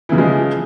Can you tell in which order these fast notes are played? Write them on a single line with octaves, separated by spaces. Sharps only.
E3 C#3 F3 G#3